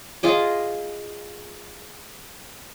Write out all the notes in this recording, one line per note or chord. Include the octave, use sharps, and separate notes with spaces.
F4 G#4 D#5 D6